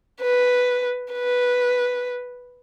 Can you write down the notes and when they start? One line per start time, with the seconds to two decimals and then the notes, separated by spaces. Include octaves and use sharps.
0.21 B4
1.13 B4